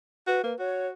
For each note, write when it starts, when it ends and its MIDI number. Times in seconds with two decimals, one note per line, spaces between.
0.27 0.43 66
0.27 0.42 71
0.43 0.53 58
0.43 0.58 71
0.59 0.93 66
0.59 0.86 73